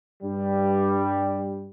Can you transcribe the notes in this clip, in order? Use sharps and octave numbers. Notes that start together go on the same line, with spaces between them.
G2 G3